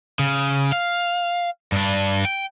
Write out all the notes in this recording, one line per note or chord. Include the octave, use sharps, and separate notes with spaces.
C#3
F5
G2 D4
G5